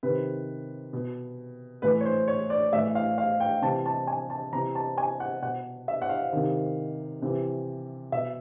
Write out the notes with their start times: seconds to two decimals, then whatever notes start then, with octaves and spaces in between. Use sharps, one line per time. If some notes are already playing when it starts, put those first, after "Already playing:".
0.03 C3 D#3 B4
0.93 B2
1.82 A2 E3 B4
2.01 C#5
2.05 C5
2.28 C#5
2.50 D5
2.73 A2 E3 E5
2.95 F5
3.18 F5
3.40 G5
3.62 C3 E3 A5
3.86 A5
4.07 G#5
4.30 A5
4.52 C3 E3 A#5
4.75 A5
4.98 G#5
5.20 F#5
5.42 B2 F#5
5.88 E5
6.02 F#5
6.09 F5
6.32 C3 D#3
7.22 C3 E3
8.12 B2 E5